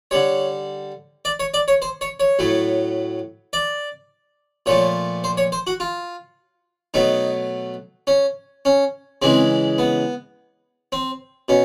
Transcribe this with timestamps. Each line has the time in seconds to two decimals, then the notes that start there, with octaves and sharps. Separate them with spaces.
0.11 D3 G3 C#5
1.25 D5
1.40 C#5
1.54 D5
1.68 C#5
1.82 C5
2.01 C#5
2.20 C#5
2.39 A2 F#3 A3
3.53 D5
4.66 A#2 F3 A3 C#5
5.24 C5
5.37 C#5
5.52 C5
5.67 F#4
5.80 F4
6.94 B2 F#3 A3 D#4
8.07 C#4
8.65 C#4
9.22 C#3 E3 G#3 C4
9.78 B3
10.92 C4
11.49 B2 C#4